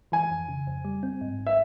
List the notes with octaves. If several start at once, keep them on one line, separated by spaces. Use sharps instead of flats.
E3 G#5
F2
C#3
F2
G3
C4
G#2
G#1
E5